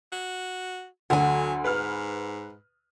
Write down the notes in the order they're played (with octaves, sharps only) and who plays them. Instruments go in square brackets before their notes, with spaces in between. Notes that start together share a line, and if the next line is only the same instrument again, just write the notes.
[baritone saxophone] F#4
[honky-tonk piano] D2 D3 [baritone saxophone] F#3 [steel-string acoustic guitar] F#5 G#5
[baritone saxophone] G#2 [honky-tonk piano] B4 F6